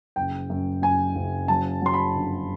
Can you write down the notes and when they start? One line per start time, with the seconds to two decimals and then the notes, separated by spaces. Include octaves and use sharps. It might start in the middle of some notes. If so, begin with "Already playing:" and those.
0.16 F#1 G5
0.50 F#2
0.82 F#2 G#5
1.15 F#1
1.48 F#3 A5
1.82 F#3 C6
1.94 B5
2.15 G1